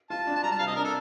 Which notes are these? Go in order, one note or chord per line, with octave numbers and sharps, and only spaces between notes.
F4 A5
D4
A5
G3 A#5
A5
C3 F5
D#5
D4 A#4
A4